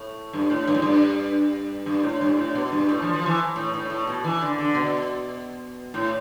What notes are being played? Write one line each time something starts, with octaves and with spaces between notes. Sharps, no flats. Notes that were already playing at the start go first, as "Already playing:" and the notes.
Already playing: A2
G2
A2
G2
A2
G2
G2
A2
G2
A2
B2
G2
A2
F3
F3
E3
A2
A2
A2
B2
E3
D3
D3
B2
A2